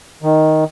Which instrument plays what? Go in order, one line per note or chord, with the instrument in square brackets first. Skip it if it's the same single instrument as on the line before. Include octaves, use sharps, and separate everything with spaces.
[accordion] D#3